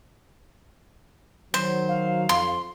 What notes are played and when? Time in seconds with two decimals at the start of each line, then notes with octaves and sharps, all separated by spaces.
1.54 D#3 F#3 C5
1.88 F5
2.29 F2 C6